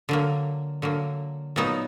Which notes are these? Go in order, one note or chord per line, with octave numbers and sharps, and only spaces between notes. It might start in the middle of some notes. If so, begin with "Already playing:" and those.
D3 F#3 A#3
D3 F#3 A#3
A#2 F#3 B3 D#4